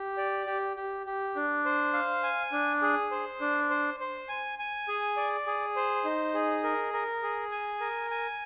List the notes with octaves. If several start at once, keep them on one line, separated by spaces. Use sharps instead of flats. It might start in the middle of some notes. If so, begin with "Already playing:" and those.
Already playing: G4
D5
G4
G4
G4
D4
C5
F5
G#5
D4
G#4
C5
D4
C5
C5
G#5
G#5
G#4
D5
G#4
C5
D#4
G#4
A#4
A#4
G#4
G#5
A#4
G#5